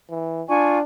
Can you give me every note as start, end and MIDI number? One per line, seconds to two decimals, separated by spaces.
0.10 0.42 52
0.50 0.84 62
0.50 0.77 65
0.50 0.77 80
0.50 0.77 85